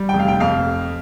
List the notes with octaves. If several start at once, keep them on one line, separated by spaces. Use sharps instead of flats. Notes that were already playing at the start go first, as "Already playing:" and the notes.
Already playing: G3
G5
F1
F5
G5
F2 F5